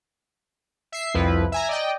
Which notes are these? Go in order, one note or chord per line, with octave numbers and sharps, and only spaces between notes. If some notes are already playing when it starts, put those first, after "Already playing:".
E5 C7
C2 F2 F3 E4 B4
E5 G#5 A#5
D5 D#5 G5